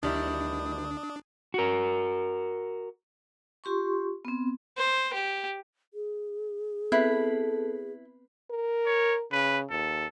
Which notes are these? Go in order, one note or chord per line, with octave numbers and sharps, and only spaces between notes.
D2 D#3 G3 D4 E4 D#6
F#4 A#4
F4 G4 C6 C#6
B3 C4
C5
G4
G#4
B3 C4 E4 A4 B4
A#4
C#5
C#3 B4
D#2 A4